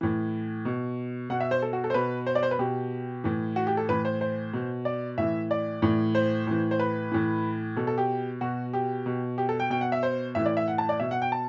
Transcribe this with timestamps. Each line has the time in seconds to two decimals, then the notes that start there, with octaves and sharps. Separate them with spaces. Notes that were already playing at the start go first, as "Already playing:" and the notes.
0.01 A2 E3
0.65 B2
1.30 B2 F#5
1.40 E5
1.51 C5
1.62 A4
1.73 F#4
1.84 A4
1.90 C5
1.94 B2 B4
2.26 C5
2.35 D5
2.43 C5
2.51 B4
2.59 B2 G4
3.24 A2 E3
3.56 F#4
3.67 G4
3.77 A4
3.89 A2 E3 B4
4.05 C5
4.21 C5
4.53 B2
4.85 D5
5.18 A2 E3 E5
5.51 D5
5.82 A2 E3
6.15 C5
6.47 A2 E3
6.71 C5
6.79 B4
7.12 A2 E3
7.76 B2 A4
7.87 A4
7.98 G4
8.41 B2 F#4
8.73 G4
9.06 B2
9.38 G4
9.49 A4
9.60 G5
9.70 B2 G5
9.81 F#5
9.92 E5
10.03 C5
10.35 A2 E3 E5
10.46 D5
10.57 E5
10.68 F#5
10.78 A5
10.89 D5
11.00 B2 E5
11.11 F#5
11.22 G5
11.32 A5